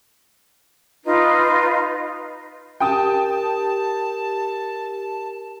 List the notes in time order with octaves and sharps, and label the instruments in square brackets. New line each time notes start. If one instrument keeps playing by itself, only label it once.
[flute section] D#4 F4 B4
[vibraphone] G4 A#4 [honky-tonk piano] G5 D#6 [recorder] A5